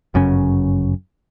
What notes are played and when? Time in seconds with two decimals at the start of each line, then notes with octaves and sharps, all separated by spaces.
0.14 G1 F#2 C#3 C#4